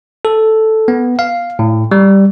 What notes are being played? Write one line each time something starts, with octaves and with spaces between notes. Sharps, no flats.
A4
B3
F5
A2
G3